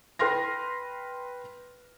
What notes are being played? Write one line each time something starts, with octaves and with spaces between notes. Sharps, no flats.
B4 G5 C6 F6 A#6